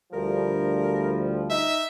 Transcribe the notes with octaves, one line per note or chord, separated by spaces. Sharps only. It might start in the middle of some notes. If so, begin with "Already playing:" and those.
D2 F3 G3 A#4
D#4 E5